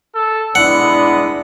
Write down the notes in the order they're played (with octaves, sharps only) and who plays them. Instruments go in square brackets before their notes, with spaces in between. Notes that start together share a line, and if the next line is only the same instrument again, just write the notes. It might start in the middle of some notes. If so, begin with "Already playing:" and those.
[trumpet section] A4
[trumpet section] G#3 B3 [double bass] D4 E4 [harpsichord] F#5